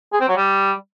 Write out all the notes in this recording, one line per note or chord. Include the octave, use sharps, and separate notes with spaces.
G#4
C4
F#3
G3